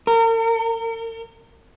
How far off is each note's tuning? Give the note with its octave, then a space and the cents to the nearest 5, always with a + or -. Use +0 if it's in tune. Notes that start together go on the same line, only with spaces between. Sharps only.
A#4 -40